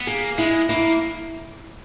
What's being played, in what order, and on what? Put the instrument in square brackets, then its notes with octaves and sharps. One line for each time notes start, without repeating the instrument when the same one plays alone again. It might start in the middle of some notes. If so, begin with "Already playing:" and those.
[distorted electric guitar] B3
[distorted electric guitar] A#3 [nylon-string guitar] G#4
[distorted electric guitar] G#3 [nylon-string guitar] E4
[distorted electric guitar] A#3 [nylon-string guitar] E4